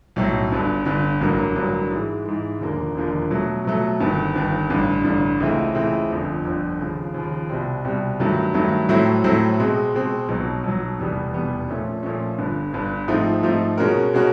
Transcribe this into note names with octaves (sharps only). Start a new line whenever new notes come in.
B1 A2 F#3
G1 G2 D3
G1 G2 D3
A1 G2 D3 F#3 A#3
A1 G2 D3 F#3 A#3
G#2 E3 G#3
G#2 E3 G#3
E1 D#2 D3 F3 A#3
E1 D#2 D3 F3 A#3
B2 F#3 A3
B2 F#3 A3
G1 G2 D#3
G1 G2 D#3
A1 G2 D3
A1 G2 D3
C#2 C#3 E3 A3 C4
C#2 C#3 E3 A3 C4
G1 F2 D3 F3
G1 F2 D3 F3
D#2 C#3 F3
D#2 C#3 F3
C2 B2 G3 C4
C2 B2 G3 C4
G2 D#3 F#3 A3
G2 D#3 F#3 A3
A2 F#3 A3 C4 E4
A2 F#3 A3 C4 E4
B2 G#3 C4
B2 G#3 C4
B1 B2 F#3
B1 B2 F#3
F1 E2 B2 G3 B3
F1 E2 B2 G3 B3
A#2 F3 A3 C#4
A#2 F3 A3 C#4
G1 G2 D3
G1 G2 D3
G#2 F3 A3 C4 D#4
G#2 F3 A3 C4 D#4
B2 G#3 C#4 F#4 A#4
B2 G#3 C#4 F#4 A#4